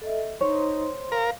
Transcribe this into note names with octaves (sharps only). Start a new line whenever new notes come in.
A4 D#5 E5
D#4 C5 C#5 C6
A#4 F5